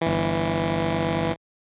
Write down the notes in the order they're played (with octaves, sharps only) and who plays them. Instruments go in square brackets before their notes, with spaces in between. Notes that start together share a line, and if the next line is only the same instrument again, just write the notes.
[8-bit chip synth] G1 E3